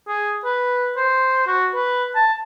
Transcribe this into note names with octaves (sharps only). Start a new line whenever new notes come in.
G#4
B4
C5
F#4
B4
A5